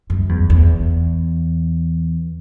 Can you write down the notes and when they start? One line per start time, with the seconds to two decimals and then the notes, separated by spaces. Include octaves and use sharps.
0.10 F#2
0.29 E2
0.50 E2